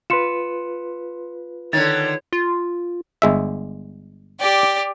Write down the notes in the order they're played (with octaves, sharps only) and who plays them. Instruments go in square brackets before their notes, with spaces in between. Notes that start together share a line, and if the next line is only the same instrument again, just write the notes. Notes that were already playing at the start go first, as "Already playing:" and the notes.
[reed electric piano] F4 B4 [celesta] C6 C#7 E7
[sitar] D3 D#3 [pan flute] C#5 [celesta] A6
[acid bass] F4
[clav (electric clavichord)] G1 G#3 E5
[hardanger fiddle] G4 D5